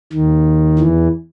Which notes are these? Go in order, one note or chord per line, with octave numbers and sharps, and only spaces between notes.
D#2 D#3
E2 E3